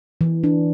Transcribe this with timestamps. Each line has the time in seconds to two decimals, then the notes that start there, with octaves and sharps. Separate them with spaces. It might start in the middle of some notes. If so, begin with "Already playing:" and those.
0.21 E3
0.44 D4